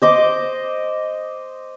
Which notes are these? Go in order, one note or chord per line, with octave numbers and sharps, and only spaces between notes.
C5 D#5 D6